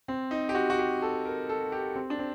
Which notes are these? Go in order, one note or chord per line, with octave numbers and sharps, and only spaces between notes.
C4
D#4
G4
F#4
F#4
G4
A4
A#4
A4
G4
C4
D4
C4